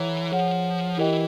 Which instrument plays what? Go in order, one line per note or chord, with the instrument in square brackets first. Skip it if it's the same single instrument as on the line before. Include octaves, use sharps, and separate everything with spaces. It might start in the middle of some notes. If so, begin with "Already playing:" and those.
Already playing: [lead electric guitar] E3 [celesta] A4 C#5 F#5 A#5
[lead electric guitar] F3 [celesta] G#4 C#5 F#5
[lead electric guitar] E3 [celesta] E4 G4 A#4 D#5 G5